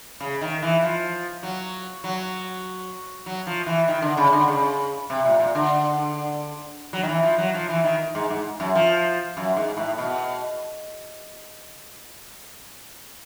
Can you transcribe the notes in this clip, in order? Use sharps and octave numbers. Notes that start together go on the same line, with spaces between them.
C#3
D#3
E3
F3
F#3
F#3
F#3
F3
E3
D#3
D3
C#3
D3
C#3
C3
A#2
A#2
D3
F#3
D#3
E3
F3
F#3
F3
E3
D#3
G#2
G#2
F#2
F3
F#2
G#2
A2
B2